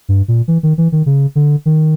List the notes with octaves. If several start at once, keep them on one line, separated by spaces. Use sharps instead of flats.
G2
A#2
E3
D#3
E3
D#3
C#3
D3
D#3